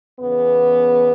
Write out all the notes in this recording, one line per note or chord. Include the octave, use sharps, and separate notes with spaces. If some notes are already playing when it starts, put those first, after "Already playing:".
E2 C#3 E3 B3